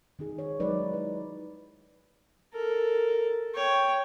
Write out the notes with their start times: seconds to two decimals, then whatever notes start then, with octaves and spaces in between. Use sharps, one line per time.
0.19 D#3 D#4 G#4
0.38 C#5
0.59 F#3 G#3 D#4 B4 D5
0.94 E4 B4
2.53 A4 A#4
3.54 C#5 G5